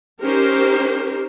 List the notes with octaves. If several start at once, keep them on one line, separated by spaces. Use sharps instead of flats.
C#4 D#4 G4 A#4 C5